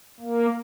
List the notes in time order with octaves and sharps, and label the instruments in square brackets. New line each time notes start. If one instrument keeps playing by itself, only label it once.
[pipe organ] A#3